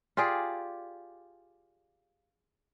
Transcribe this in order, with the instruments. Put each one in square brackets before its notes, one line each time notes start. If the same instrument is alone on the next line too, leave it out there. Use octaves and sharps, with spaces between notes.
[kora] F4 G4 G#4 D5